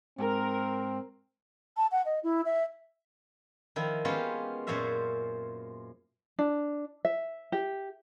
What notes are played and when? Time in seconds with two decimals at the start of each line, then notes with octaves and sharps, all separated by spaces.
0.18 G#2 C4 A#4
1.77 A5
1.92 F#5
2.06 D#5
2.24 E4
2.45 E5
3.76 D#3 F3 E4
4.05 G#3 A#3 B3 C#4 F4 G4
4.67 F#2 A#2 C5 C#5 E5 F5
6.39 D4
7.05 E5
7.52 G4